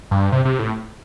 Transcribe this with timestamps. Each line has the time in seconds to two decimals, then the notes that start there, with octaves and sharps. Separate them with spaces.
0.11 G2
0.32 C3
0.45 C3
0.59 A2